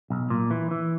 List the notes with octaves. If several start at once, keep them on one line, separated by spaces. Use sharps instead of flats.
B1
A#2
E3
E3